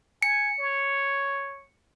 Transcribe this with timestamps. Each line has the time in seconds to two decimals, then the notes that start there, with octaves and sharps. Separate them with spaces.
0.22 G#5 C#7
0.59 C#5